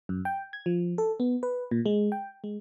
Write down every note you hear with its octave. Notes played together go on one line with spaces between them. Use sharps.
F#2
G5
G#6
F3
A4
B3
B4
A#2
G#3
G5
G#3